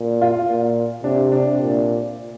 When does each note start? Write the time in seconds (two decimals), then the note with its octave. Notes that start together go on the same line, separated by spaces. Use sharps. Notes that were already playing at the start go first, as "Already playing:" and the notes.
Already playing: A#2
0.21 F4
0.48 A#2
1.04 C3 D4
1.32 D4
1.60 A#2